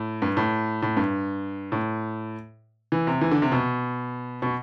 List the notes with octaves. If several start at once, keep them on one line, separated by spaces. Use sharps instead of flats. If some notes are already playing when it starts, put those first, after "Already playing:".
Already playing: A2
G2
A2
A2
G2
A2
E3
C3
E3
D3
C3
B2
B2